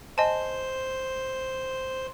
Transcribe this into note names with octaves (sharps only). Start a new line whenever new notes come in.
C5 D#5 G#5 A5